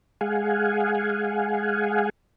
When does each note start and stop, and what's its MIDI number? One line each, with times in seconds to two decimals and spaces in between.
0.21 2.10 56
0.21 2.10 68
0.21 2.10 77
0.21 2.10 78
0.21 2.10 80